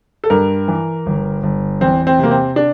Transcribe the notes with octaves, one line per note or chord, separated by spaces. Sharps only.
A4
G2 A#4
E3
G1
G1
E2 C4
C4
C3 A#3
C4
D4